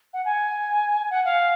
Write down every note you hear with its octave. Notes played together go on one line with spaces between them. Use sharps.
F#5
G#5
F#5
F5